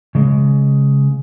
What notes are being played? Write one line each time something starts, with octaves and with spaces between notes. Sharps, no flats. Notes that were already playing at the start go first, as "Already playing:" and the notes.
C#3 G#3